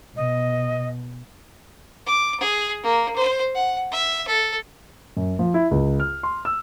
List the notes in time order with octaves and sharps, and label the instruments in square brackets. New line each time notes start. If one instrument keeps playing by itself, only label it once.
[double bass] B2 [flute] D#5
[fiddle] D6
G#4
A#3
C5
F#5
E5
A4
[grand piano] F#2
F3
E4
C#2
F6
C6
E6